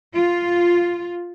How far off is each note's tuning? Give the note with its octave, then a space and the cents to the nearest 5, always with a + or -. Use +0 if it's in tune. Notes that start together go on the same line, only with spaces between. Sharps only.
F4 -5